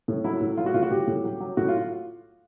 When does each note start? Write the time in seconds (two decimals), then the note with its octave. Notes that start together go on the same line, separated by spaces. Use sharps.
0.08 A2
0.24 F#3 E4
0.41 A2
0.57 F#3 F4
0.66 F#4
0.74 A2 F4
0.83 F#4
0.91 A2 G4
1.07 A2
1.24 F#3
1.40 F#3
1.57 A2 F#4
1.68 F4